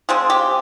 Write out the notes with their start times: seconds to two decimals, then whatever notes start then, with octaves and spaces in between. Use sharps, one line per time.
0.09 F3 G#3 C4 G#4
0.30 G4